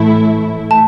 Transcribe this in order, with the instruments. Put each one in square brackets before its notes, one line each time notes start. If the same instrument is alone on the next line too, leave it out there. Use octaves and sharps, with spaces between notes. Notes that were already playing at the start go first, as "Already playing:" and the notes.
Already playing: [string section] A2 E3 A3 E4
[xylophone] A5